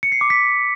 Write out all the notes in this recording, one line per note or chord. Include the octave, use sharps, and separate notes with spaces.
C#7
C7
D6
B6